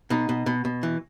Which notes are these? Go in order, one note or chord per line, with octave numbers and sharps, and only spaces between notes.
B2 D#4
B2
B2
B2
E3